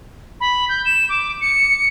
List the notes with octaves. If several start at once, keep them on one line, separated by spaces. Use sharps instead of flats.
B5
G6
E7
D6
C#7